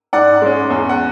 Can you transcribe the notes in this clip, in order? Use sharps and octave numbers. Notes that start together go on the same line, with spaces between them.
G#2 D5 F#5
G#3 C#4
E2
F#5